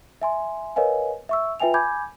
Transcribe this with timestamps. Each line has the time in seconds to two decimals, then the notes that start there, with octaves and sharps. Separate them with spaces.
0.22 E5 G#5 C6
0.76 A#4 B4 C#5 D#5 F5 G#5
1.29 E5 C#6 E6
1.60 F4 B4 E5 G5 G#5 F7
1.74 G#5 B5 D6 G6 G#6